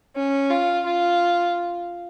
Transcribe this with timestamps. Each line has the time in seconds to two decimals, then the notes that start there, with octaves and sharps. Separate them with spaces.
0.16 C#4
0.50 F4
0.86 F4